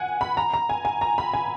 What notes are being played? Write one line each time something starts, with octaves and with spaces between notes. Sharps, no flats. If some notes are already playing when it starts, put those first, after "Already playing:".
Already playing: F#5 G#5
B5
A#5
A#5
G#5
G#5
A#5
B5
G#5